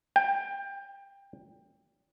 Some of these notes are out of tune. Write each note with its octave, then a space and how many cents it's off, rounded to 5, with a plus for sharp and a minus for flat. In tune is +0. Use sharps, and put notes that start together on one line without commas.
G5 +20